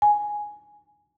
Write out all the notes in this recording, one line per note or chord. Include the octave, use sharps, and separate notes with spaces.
G#5